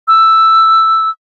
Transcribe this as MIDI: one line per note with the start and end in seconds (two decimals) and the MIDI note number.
0.08 1.10 88